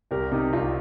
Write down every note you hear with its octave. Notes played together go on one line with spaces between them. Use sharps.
C2 G4 A#4
C3 D#4 G4
C2 F4